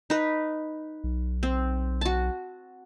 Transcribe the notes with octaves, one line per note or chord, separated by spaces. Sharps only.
D#4 B4
B1
C4
F#4 A5